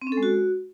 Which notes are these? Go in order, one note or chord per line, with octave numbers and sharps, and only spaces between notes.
C4
C#4
A4
G#3
F#4